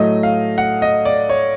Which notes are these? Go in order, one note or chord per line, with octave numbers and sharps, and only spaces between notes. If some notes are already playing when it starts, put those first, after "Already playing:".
Already playing: A2 F#3 A3 D#5
F5
F#5
D#5
D5
C#5